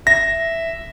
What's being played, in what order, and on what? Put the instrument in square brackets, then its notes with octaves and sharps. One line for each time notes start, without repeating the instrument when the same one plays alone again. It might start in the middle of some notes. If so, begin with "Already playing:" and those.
[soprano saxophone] E5 [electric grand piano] A#6